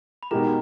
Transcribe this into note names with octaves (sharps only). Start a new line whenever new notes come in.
B5
B2 G#3 D#4 G4 A#4 A#5